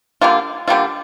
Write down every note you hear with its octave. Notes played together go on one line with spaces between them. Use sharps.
D3 G3 A#3 F4
D3 G3 A#3 F4